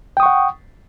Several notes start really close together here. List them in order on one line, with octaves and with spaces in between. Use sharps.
G5 D#6 C#6 F#5